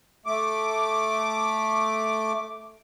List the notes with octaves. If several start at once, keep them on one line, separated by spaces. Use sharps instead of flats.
A3 D6